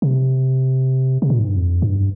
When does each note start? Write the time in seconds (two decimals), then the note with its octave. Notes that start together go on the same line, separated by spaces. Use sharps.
0.02 C3
1.22 C3
1.30 A#2
1.39 G#2
1.48 G2
1.57 F2
1.82 G2